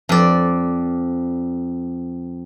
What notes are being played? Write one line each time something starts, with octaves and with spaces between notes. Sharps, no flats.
F2 D5